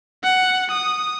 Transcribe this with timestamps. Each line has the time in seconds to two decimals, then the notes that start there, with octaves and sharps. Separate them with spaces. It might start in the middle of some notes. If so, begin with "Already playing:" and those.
0.24 F#5
0.71 D#6